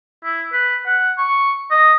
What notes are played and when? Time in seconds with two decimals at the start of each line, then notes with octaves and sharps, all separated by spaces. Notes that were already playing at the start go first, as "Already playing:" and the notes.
0.24 E4
0.53 B4
0.85 F#5
1.18 C#6
1.71 D#5